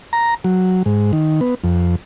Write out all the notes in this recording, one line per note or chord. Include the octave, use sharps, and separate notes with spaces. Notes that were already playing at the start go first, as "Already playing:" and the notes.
A#5
F#3
G#2
D#3
B3
F2